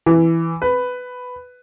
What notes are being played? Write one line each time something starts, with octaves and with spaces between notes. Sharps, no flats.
E3
B4